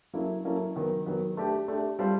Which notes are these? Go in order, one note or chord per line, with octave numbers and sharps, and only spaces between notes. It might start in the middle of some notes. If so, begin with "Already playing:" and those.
F#3 A#3 C#4 E4 A4
F#3 A#3 C#4 E4 A4
D#3 F#3 B3
D#3 F#3 B3
A3 D4 G4
A3 D4 G4
G3 C4 F4 A4 C5